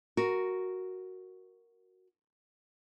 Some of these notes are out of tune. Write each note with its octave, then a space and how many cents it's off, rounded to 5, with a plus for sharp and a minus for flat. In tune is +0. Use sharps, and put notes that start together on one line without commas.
F#4 +0 A#4 +0